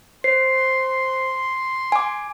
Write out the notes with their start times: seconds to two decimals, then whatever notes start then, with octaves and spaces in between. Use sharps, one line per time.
0.24 C5 C6 C7
1.92 G#5 D6